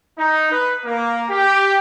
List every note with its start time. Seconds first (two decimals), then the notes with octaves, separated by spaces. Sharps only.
0.18 D#4
0.51 B4
0.85 A#3
1.30 G4